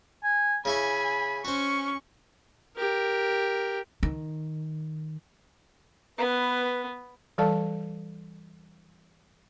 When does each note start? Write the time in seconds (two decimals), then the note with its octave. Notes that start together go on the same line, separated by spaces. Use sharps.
0.24 G#5
0.65 C#3 E4 G#5 B5 C#6
1.45 C#4 F#4 C5 C#6
2.77 G4 A#4
4.03 D#3
6.18 B3 B4
7.38 E3 G3 A4 D5 F5 A5